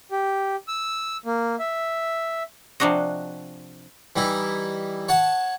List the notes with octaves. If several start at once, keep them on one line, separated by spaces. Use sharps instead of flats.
G4
E6
A#3
E5
C3 F3 D4 F#4 D#5
E3 G3 D#4 E4
C#5 F#5 A5